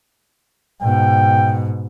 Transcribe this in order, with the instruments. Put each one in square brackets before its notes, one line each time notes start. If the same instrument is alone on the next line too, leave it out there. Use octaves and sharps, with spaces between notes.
[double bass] G#2 B2 [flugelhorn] G5